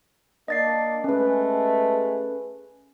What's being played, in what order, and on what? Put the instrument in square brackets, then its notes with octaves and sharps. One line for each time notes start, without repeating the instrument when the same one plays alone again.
[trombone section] A#3 D4 [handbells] D#5 A6 C7
[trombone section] G#3 A3 [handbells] C#4 B4